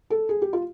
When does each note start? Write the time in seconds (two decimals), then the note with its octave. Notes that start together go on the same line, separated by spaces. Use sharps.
0.10 A4
0.29 G#4
0.42 G4
0.53 F4